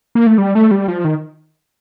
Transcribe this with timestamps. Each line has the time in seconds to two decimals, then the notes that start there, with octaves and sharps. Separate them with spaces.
0.15 A#3
0.27 A3
0.38 G3
0.55 A3
0.71 G3
0.88 F3
1.05 D#3